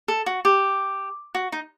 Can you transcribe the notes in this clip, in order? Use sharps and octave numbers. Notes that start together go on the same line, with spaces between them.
A4
F#4
G4
F#4
D#4